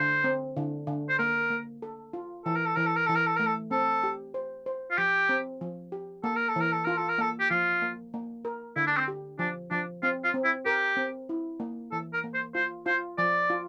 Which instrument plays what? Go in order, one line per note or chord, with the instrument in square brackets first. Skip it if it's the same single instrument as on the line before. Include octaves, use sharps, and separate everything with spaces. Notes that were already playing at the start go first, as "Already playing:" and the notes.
Already playing: [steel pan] D3 [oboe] C5
[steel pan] C4
D3
D3
[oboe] C5
[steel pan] A#3 [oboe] A#4
[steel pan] A#3
A4
F4
[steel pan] E3 [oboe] A4
[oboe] A#4
A4
[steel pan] E3 [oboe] A#4
[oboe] A4
A#4
[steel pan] E3 [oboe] A4
[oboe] A#4
A4
[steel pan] A3 [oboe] A#4
[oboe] A4
[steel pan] C4 [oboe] A4
[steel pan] G4
C5
C5
[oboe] F4
[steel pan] F3 [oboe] G4
[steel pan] C4
F3
G4
[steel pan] A#3 [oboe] A4
[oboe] A#4
A4
[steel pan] E3 [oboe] A#4
[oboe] A4
[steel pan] F4 [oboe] A#4
[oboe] A4
A#4
[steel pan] A#3 [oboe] A4
[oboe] G4
[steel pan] F3 [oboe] F4
[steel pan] A#3
A#3
A#4
[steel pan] D3 [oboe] E4
[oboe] D4
C4
[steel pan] G4
[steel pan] F3 [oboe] D4
[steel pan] F3 [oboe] D4
[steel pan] C4 [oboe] F4
[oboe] F4
[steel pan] C4
[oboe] E4
[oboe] G4 [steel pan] A#4
[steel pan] C4
E4
A#3
[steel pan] E3 [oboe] A4
[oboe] A#4
[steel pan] A#3
[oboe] C5
[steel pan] F4 [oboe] C5
[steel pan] F4 [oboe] C5
[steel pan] F3 [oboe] D5
[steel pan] F4